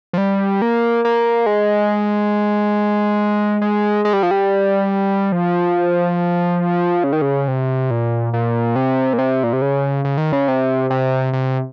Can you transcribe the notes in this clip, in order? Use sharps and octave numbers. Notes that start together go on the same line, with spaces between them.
F3
G3
A#3
A#3
G#3
G#3
G#3
G3
F3
G3
F3
C#3
D#3
C#3
C3
A#2
A#2
C3
A#2
C3
A#2
C3
C#3
C#3
D#3
C#3
C3
C3
C3